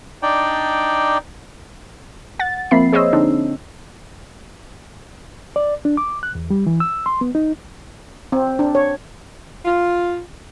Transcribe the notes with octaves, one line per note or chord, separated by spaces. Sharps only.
D4 D#4 D5 G5
F#5 A6
F3 A#3 C4 E5 B5 C7
G#4 C5 C#5 D#5 E6
D3 C4 D4 D#4
D5
D4
D6
F#6
E2
G3
E3
E6
C6
B3
D#4
C4
D4
C#5
F4